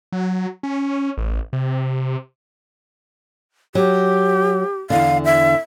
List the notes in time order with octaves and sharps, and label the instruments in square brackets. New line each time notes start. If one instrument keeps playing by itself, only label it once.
[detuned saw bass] F#3
C#4
A1
C3
[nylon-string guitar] F#3 [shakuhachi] G4
[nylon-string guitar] E2 D3 [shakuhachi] F5
[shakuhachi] E5